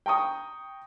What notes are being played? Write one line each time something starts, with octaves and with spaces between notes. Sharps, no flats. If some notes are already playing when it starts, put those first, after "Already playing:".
G5 A#5 C#6 D#6